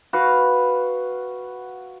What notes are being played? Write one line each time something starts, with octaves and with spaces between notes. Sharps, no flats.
F#4 B4 F5